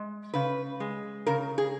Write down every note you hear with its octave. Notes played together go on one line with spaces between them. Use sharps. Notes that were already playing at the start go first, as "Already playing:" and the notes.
Already playing: G#3
C#3 B4
G#3
C#3 A#4
G#4